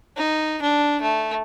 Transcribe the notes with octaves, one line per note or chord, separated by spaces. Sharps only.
D#4
D4
A3